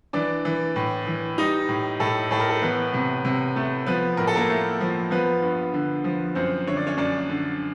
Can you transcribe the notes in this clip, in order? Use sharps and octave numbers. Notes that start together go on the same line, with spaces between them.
E3 D4 D5
E3
A2
E3
G3 D#4 D#5
A2
A2 A4
A2 A4
A#4
A4
E3 B3 B4
C3
C3
A3
F3 B3 B4
A2 A#4
A4
A#3 A#4
A3
F3
F3 B3 B4
G2
D3
F3
F#2 C4 C5
D3 C#5
D5
C#4 C#5
F#2 D4 D5
D3